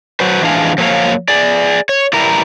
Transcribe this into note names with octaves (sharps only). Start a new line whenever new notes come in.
F#3 F#4 B4 C5
E3 F3 G#3 D4 G#4 F5
F3 F#3 A#3 A#4 C#5 F5
G#4 D5
C#5
E3 G3 E4 A#4 A#5